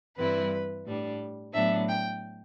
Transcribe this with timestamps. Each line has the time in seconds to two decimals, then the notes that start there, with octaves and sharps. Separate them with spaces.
0.16 G2 E3 G3 C4 E4 B4
0.85 A2 G3 D4
1.53 A2 F#3 B3 D4 E5
1.88 G5